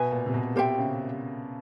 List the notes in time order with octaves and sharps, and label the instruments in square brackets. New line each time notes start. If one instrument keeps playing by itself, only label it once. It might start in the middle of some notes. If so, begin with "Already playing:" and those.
Already playing: [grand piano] B2 [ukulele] B4 E5 G#5
[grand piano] A#2
C3
B2
[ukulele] G4 C5 E5 G5
[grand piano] C#3